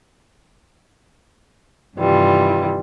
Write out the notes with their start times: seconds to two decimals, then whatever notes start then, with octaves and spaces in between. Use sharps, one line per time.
1.96 G2 C3 D#3 E3 G3 F4